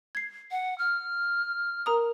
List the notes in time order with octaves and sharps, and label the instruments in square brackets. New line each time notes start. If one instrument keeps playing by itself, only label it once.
[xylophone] G#6 C7
[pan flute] F#5
F6
[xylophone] A#4 A#5 D#6